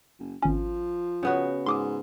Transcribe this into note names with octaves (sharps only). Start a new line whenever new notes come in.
F#1
G#1 F3 C#4
C#3 B3 F#4
G#2 C6 D6 D#6